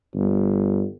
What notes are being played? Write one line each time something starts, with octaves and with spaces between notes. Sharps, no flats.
G1